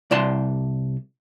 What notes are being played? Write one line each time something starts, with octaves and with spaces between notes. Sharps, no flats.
C2 D5 A5 C6